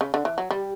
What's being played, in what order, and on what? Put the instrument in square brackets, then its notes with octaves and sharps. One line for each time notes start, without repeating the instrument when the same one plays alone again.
[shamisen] C#3
D3
E3
F#3
[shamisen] G3 [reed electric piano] G4